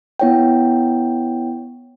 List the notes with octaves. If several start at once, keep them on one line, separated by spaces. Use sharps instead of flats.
B3 E4 C#5 F#5 G5